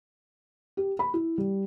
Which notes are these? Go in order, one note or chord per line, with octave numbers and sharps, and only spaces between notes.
G4
B5
E4
G3